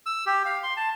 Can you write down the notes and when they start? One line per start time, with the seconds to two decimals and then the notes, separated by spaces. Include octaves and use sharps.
0.06 E6
0.26 G4
0.46 F5
0.63 C6
0.77 A5